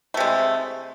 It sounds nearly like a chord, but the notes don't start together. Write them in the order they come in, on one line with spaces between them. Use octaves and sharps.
A3 C3 G#3